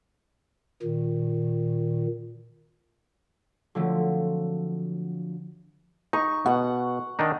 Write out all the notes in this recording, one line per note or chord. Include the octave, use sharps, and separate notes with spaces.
A#2 D#3
D3 F3 F#3 A3 C4
D#4 C#6
B2 F#5
D#3 D4 D#4